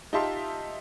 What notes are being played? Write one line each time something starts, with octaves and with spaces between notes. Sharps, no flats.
D#4 F4 G4 E5 A5 C6